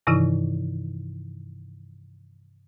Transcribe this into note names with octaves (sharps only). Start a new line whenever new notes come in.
G2 C3 D#3 E3 D#4 E4